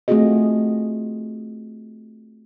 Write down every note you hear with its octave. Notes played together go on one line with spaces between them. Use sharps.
A3 C4 F4 F#4 G#4 D#5